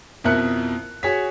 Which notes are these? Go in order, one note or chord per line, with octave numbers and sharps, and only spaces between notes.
F2 B2 E4 A#4 F#6 C#7
F#4 G#4 C#5 B6